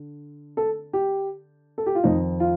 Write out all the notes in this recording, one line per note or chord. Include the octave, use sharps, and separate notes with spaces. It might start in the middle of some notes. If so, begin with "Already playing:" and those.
Already playing: D3
A4
G4
A4
G4
F4
F2 D#3 D#4
F4